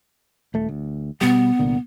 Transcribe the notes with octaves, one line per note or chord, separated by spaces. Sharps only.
D#1 A3
D2
B2 G3 B3
C2 A#2 D3